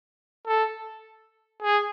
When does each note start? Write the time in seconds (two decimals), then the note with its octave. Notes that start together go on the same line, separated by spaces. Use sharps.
0.47 A4
1.62 G#4